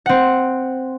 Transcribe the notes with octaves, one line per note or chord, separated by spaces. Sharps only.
C4 F#5